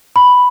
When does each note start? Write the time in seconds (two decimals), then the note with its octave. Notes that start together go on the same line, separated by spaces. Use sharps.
0.16 B5